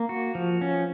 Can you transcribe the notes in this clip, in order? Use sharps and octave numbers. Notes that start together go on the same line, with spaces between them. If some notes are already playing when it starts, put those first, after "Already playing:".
Already playing: A#3
F#4
F3
C#4